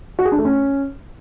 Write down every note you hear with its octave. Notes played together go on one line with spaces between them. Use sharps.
F#4
G#4
D4
A3
C#4